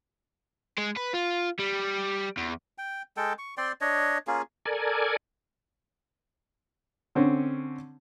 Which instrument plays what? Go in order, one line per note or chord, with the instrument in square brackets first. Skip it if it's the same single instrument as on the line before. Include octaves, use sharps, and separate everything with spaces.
[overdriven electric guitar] G#3
B4
F4
G3
E2
[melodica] G5
G#3 A4 G5
C#6
C4 D5 G5 C6
D4 C#5 D#5
A#3 C#4 F4 G#4
[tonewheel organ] A4 A#4 D5 G#5
[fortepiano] D3 C4 C#4